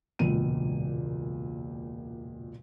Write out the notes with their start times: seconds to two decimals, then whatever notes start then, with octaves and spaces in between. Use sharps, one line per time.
0.19 E1 C#2 A#2 D#7